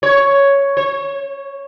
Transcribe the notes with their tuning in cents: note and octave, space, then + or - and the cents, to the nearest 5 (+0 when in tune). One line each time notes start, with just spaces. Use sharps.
C#5 +5
C#5 -35